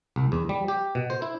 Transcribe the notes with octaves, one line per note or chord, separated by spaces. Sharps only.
C2
E2
G3
G4
B2
C5
E4